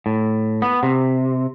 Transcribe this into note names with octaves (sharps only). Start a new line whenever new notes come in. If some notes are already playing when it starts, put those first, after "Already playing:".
A2
B3
C3